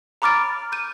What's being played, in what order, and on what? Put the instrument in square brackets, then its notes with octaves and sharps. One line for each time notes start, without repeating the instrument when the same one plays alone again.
[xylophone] A#5 B5 D6 F6 A6 D7
G6 D#7